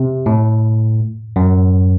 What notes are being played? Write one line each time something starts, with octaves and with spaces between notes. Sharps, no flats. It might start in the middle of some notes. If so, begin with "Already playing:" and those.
Already playing: C3
A2
F#2